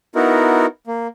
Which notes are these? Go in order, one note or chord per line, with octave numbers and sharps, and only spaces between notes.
B3 D#4 E4 F#4 A#4
A#3